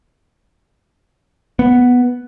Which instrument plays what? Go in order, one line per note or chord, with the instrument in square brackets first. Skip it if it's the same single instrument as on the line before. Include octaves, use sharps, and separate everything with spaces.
[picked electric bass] B3